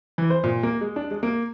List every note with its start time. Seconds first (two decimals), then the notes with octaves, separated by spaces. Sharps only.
0.18 E3
0.30 C5
0.44 A#2
0.63 A#3
0.81 G#3
0.96 D4
1.11 G#3
1.23 A#3